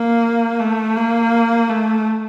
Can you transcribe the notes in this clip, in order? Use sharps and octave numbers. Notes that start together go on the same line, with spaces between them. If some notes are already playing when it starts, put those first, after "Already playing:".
Already playing: A#3
A3
A#3
A3